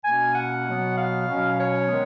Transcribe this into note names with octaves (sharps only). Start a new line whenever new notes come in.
B2 A#3 C#4 G#5
F#5
B2 F#3 B3
F5
B2 F#3 C#4
C#5
D#3 G#3 B3